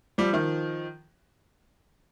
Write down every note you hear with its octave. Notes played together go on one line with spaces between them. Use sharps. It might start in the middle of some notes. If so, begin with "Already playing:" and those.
F3 G3
D#3 F3